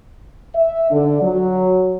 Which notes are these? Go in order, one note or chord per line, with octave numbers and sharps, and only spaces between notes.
E5
D3
F#3